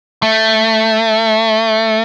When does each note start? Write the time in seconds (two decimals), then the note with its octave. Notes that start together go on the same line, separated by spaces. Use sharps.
0.23 A3